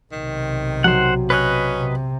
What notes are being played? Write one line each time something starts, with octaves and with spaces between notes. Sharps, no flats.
B1 C3 D#3
F#3 C5 F#5
C#4 B4 D#5 F#6
C3